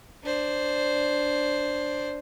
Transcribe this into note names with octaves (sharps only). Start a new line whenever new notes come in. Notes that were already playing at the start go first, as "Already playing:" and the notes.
D4 C5